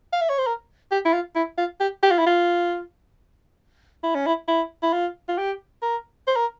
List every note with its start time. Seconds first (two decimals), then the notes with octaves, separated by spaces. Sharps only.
0.13 F5
0.21 E5
0.30 C#5
0.38 C5
0.47 A#4
0.91 G4
1.05 E4
1.13 F4
1.36 E4
1.58 F4
1.80 G4
2.03 G4
2.11 F4
2.19 E4
2.26 F4
4.03 E4
4.15 C#4
4.26 E4
4.48 E4
4.83 E4
4.93 F4
5.29 F4
5.38 G4
5.82 A#4
6.27 C5
6.36 A#4